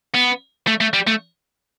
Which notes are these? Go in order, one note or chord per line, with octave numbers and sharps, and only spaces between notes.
B3
A3
A3
G3
A3